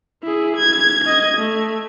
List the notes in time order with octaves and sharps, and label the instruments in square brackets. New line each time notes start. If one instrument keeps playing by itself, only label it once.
[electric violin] E4 G#4
G#6
D#5 G#6
A3